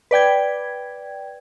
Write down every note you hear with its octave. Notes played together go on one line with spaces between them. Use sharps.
B4 D5 G5 G#6